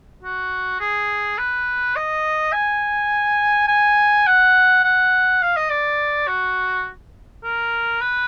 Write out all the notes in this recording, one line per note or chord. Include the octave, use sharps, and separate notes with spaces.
F#4
G#4
B4
D#5
G#5
G#5
F#5
F#5
F5
D#5
D5
F#4
A#4
B4